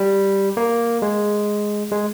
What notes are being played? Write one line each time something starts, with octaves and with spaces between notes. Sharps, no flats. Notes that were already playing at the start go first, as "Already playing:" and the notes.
Already playing: G3
A#3
G#3
G#3